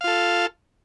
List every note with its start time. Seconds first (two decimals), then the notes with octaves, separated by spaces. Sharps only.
0.01 F5
0.04 F4
0.08 A4